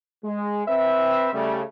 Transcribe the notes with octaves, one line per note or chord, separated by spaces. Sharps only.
G#3
C4 B4 E5
C#3 G3 A3